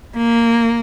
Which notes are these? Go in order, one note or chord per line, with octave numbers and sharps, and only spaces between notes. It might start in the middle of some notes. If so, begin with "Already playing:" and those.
A#3